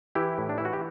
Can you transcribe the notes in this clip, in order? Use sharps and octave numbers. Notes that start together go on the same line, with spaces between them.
E3 E4 G4
A2
D4
E3 E4
F#4
G4